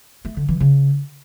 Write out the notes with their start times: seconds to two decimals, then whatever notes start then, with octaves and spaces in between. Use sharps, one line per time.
0.25 A3
0.37 D3
0.48 E3
0.60 C#3